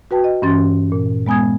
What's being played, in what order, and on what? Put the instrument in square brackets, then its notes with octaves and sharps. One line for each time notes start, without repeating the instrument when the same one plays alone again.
[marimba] F#4 B4 G5 A5
D#5
G2 E3 C#4 C6 A6
A#2
G#3 B3 G#5 D#6 G#6